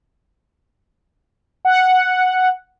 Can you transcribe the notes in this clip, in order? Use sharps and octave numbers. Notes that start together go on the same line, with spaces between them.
F#5